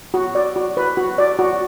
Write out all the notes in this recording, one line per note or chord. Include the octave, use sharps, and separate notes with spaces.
F#4
D5
F#4
B4
F#4
D5
F#4